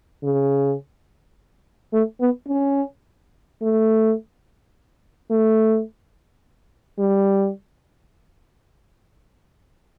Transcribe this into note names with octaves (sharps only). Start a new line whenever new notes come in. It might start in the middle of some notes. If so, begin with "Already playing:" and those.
C#3
A3
B3
C#4
A3
A3
G3